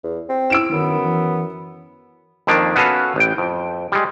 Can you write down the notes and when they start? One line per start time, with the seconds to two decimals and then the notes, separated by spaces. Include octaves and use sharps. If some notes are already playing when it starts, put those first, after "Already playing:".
0.04 E2
0.29 C4
0.50 E4 E6 D7 E7
0.72 F#2 D#3 B3
1.03 E3
2.47 F2 D#3 F3 A#3 D4
2.76 B3 C#4 F#4 A4 B4 F5
3.16 A1 G5
3.38 F2
3.92 G3 G#3